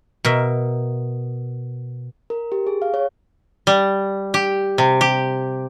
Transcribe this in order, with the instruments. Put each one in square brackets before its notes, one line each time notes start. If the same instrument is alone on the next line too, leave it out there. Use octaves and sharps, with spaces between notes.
[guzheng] B2 A#4 E5
[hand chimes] A#4
G4
G#4
F5
C#5
[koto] G3
G4
C3
G4